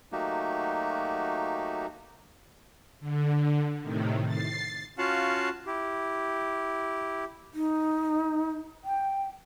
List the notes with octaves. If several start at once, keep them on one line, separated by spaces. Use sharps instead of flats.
F#3 A3 A#3 D#4 F#4 G4
D3
A2 C3 D#3
A6 C7
C#4 F4 F#4 F5 F#5 A5
E4 G4
D#4
G5